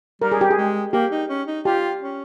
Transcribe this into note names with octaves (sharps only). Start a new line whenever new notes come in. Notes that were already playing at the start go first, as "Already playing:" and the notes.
G3 A#4
G#4
G4
G#4
G#3
A#3 G4
D#4
C#4
D#4
F4 G4
C#4